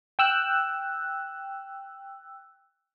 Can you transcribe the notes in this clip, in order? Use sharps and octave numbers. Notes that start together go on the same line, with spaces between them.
G5 E6 F#6